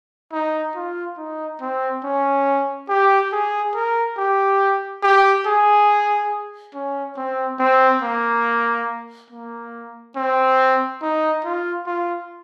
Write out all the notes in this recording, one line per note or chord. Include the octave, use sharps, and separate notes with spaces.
D#4
F4
D#4
C4
C#4
G4
G#4
A#4
G4
G4
G#4
C#4
C4
C4
A#3
A#3
C4
D#4
F4
F4